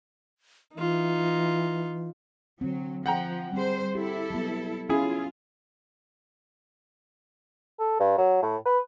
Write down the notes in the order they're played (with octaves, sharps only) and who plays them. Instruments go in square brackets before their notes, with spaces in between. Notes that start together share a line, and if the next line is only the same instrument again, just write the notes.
[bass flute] E3 [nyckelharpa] D#4 F4
[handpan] D3 C4 [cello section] F#3
[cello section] F3 [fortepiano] F#5 G5 A#5
[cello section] G3 C5 [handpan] C4 G#4
[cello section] E4 A4 [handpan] G4
[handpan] F#3 G3 B3
[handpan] C#4 [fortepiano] E4 G#4 [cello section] F4
[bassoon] A4
G2
F#3
A2
B4